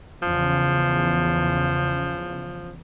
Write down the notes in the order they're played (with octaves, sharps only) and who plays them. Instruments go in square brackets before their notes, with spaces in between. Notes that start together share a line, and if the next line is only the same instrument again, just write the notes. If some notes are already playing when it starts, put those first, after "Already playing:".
[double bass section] E2 C#3 [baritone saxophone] F3